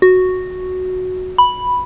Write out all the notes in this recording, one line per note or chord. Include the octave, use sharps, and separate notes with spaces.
F#4
B5